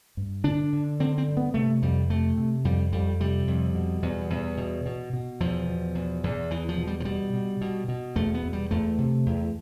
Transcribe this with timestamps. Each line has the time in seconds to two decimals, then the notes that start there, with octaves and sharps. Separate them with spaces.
0.17 G2
0.44 D3 D4
0.73 D3
1.00 D3 C4
1.18 C4
1.27 G2
1.37 B3
1.54 C3 A3
1.82 F2 G3
2.10 C3 A3
2.38 C3
2.65 F2 G3
2.93 F2 G3
3.20 C3 G3
3.48 F2
3.75 B2
4.02 E2
4.30 E2
4.57 B2
4.86 B2
5.13 B2
5.40 E2 F3
5.68 B2
5.95 E2
6.24 E2
6.50 E2 E3
6.69 F3
6.77 B2
6.87 G3
7.00 F3
7.05 B2 G3
7.34 B2
7.61 B2
7.88 B2
8.16 E2 A3
8.34 B3
8.43 E2
8.53 G3
8.71 E2 A3
8.98 C3
9.26 E2